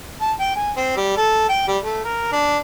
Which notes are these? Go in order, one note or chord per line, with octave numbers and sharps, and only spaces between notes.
A5
G5
G#5
C4
G3
A4
G5
G3
A3
A#4
D4